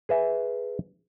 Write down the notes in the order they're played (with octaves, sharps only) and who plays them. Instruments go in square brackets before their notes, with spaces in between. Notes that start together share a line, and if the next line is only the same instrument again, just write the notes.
[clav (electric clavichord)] G#4 B4 E5